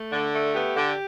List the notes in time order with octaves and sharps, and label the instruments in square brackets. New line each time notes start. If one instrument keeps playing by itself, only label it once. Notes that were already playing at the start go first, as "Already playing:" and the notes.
Already playing: [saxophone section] A3
D3
A3
B3 G4
D3